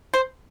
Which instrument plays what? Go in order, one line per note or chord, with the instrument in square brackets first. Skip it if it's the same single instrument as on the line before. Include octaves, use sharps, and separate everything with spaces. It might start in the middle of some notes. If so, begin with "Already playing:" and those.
[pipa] C5